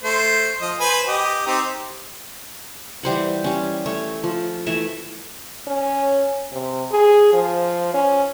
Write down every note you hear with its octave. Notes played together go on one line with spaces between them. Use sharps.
A3 C5
F3 D#5
B4 C5 G#5
G4 D#5
C4 D#4 G4
E3 G3 C5 F#5
G3 C#4
A3 C#5
F3
E3 A3 C#5 E5
C#4
C3
G#4
F3
C#4